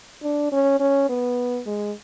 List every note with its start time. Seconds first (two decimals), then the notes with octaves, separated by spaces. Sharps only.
0.23 D4
0.52 C#4
0.80 C#4
1.09 B3
1.66 G#3